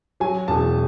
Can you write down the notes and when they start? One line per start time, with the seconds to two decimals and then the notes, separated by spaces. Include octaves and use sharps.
0.20 F#3 G#5
0.48 E1 A5